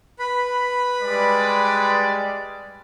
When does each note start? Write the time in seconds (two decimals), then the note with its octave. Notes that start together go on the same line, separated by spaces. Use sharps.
0.19 B4 B5
1.01 G3 G#3 D5